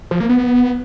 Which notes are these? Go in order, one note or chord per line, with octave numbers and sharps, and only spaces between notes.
F3
A#3
B3